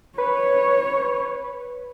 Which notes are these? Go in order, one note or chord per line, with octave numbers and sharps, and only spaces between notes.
B4 C#5